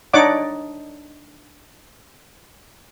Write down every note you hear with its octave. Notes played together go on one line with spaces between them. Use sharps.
D4 D#4 C#5 D5 F#5 D6